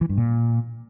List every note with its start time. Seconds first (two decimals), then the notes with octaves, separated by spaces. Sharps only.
0.01 E3
0.09 G2
0.18 A#2